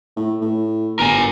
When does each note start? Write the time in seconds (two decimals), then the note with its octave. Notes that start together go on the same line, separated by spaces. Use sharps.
0.17 A2
0.41 A2
0.99 G1 A#4 G#5